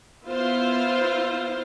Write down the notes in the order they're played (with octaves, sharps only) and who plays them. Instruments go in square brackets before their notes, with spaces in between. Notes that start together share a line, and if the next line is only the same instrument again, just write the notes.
[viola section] B3 E4 F4 C5 F5